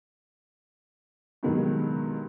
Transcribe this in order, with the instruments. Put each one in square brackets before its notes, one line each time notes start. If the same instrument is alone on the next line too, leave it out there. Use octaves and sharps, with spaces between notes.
[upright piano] G2 B2 D#3 F#3 G#3